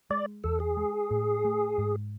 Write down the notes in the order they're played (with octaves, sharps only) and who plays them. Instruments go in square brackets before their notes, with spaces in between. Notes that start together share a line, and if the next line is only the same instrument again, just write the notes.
[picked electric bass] G#3 [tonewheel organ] D5
[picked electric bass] E2 [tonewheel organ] A4
[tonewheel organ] G#4
[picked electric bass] G#3
A2
A3
G#2